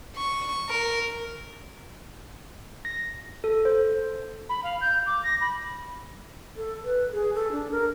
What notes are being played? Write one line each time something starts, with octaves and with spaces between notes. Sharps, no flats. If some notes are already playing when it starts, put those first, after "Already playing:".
C#6
A#4
A#6
A4
C5
B5
F5
G6
D6
A#6
B5
A4
B4
G#4
A4
D4
A#4